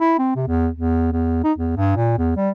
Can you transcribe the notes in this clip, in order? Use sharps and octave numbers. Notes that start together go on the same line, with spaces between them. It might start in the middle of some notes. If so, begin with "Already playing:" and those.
E4
C4
C3
E2
E2
E2
D#4
E2
G2
A#2
E2
G3